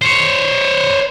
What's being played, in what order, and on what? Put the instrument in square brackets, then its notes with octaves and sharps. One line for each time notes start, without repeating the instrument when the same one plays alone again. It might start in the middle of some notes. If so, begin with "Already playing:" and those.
[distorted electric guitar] C5 C#5